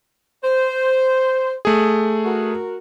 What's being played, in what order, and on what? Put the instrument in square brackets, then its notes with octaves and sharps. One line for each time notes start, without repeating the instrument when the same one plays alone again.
[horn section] C5
[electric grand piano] A3 G#4
[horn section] F#4 A#4